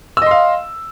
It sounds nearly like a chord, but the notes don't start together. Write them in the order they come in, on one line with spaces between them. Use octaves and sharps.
E6 D#5 C6 F5